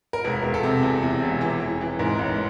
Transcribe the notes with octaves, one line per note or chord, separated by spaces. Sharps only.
A#4
E1 B4
E1
A4
C3
E2
E2
E1
E3
E3
E3
G#2 A#4
A1